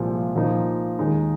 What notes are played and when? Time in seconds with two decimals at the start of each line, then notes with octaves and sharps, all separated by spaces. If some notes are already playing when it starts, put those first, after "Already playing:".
Already playing: C2 A#2 F3 G#3
0.35 A#2 F3 A#3 D#4
0.99 D#2 D#3 G#3 D#4